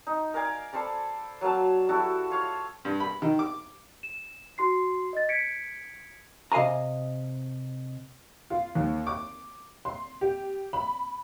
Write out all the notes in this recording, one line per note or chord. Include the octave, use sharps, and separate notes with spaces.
D#4
A#4 D5 F5 G#5
A4 C5 D5 B5
F#3 A#3 F5 A5
E4 F#4 G4 A4
F4 C#5 F5
G2
B5
D#3
D6
E7
F#4 C6 C7
D#5 A6
G#6 B6 C#7 D7
C3 D#5 F5 G#5 A#5
F4
D#2
D6
C6
G4
B5